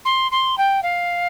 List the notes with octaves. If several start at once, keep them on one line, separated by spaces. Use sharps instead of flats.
C6
C6
G5
F5